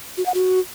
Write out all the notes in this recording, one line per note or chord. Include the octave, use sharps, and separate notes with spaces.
F#4
F#5
F#4